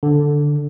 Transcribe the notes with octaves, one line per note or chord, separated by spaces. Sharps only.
D3